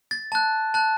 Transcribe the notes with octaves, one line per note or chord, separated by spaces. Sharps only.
A6
A5 F#6
A5 F#6